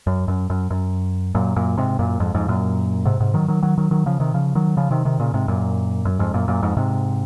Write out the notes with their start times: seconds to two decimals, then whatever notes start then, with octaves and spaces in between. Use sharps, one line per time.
0.07 F#2
0.28 F#2
0.50 F#2
0.70 F#2
1.35 F#2 A#2
1.56 F#2 A#2
1.77 G#2 C3
1.99 F#2 A#2
2.20 F2 G#2
2.34 F2 G#2
2.48 F#2 A#2
3.05 G#2 C3
3.20 G#2 C3
3.34 D#3 F#3
3.48 D#3 F#3
3.63 D#3 F#3
3.78 D#3 F#3
3.91 D#3 F#3
4.06 C#3 F3
4.20 C3 D#3
4.34 C#3 F3
4.55 D#3 F#3
4.77 C#3 F3
4.91 C3 D#3
5.05 C3 D#3
5.20 A#2 C#3
5.34 G#2 C3
5.48 F#2 A#2
6.05 F#2
6.19 F2 G#2
6.34 F#2 A#2
6.48 F#2 A#2
6.62 F2 G#2
6.77 G#2 C3